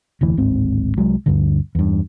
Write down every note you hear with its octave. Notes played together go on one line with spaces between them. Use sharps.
F1 D2 E3
D1 G#1 G#2 C4
C2 F#3 G#3
D2 G2 D3
E2 G2